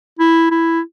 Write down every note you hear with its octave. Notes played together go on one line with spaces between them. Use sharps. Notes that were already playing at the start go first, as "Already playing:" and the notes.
E4
E4